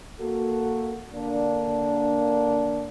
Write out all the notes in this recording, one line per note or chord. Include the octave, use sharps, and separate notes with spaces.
A#3 F#4 A4
D3 A#3 D4